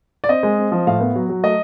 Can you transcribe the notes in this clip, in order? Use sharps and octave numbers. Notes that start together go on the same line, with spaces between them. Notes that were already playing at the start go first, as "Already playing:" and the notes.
D5
C4 D#5
G#3
C4
F3
A2 F5
B3
F#3
F#3
A3 D#5